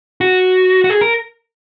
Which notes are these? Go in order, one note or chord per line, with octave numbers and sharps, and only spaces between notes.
F#4
F#4
G#4
A#4